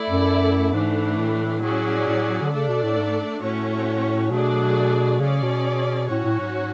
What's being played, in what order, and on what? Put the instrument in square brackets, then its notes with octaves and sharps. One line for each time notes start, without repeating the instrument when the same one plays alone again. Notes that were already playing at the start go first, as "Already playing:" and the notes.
Already playing: [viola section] A3 E4 A4 D5
[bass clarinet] F#2
[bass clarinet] G#2 [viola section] E3 A3 D4
[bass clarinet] A2
[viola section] F#3 C#4 G#4 D5
[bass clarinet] A2
D3
[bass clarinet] C#3 [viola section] A3 D4 A4 D5
[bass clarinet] B2
A2
G#2
[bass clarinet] A2 [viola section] A3 C#4 F#4 C#5
[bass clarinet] B2 [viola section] F#3 A3 D4 G#4 D5
[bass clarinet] C#3 [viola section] C#4 G#4 D5
[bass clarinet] B2
[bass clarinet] A2 [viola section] F#3 C#4 F#4 C#5
[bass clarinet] A2
G#2